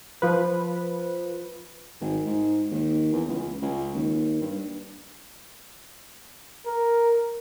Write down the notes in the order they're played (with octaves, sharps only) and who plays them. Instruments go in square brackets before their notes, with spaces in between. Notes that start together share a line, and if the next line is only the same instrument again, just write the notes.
[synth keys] F3 B4
[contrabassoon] G#1
G#2
D#2
E2
C#2
C#2
D#2
G2
[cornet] A#4